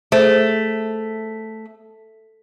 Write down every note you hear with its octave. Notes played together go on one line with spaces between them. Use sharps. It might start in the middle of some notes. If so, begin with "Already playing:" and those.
A3 G#4 C5